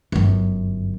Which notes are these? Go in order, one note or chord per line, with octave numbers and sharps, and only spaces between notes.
G1 F#2